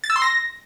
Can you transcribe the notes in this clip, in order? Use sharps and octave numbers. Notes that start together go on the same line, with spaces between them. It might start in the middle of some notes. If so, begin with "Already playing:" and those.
A6
E6
C6
A#6